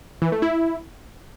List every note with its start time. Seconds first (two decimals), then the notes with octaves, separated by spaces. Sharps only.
0.22 E3
0.32 A3
0.42 E4